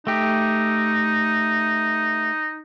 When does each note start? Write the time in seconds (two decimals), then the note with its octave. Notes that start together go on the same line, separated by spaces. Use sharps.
0.07 A3 D#4 G4